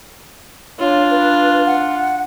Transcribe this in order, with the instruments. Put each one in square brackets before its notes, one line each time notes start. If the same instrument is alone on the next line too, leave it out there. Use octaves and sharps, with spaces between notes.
[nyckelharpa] D4 F4 [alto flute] C#5
[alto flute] B4
F#5